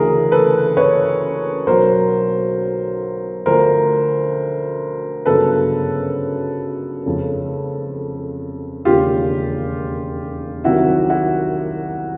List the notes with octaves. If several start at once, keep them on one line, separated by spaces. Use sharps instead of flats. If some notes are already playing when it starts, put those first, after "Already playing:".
Already playing: D2 C#3 E3 G#4 A#4
A4 B4
B4 C#5
B1 B2 F#3 A#4 C5
D2 D3 F3 A#4 C5
G1 F#2 C#3 A4 B4
F1 F2 C#3
E1 D#2 C#3 F4 G4
C2 C3 D#3 F#3 E4 F#4
E4 F#4